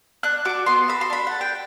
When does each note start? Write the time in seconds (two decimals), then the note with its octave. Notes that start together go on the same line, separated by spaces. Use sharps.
0.23 D4 F#6
0.45 F#4 A4 D6
0.66 B3 C6
0.88 F#4 A4 B5
1.01 C6
1.10 D4 B5
1.27 A4 F#5
1.41 G5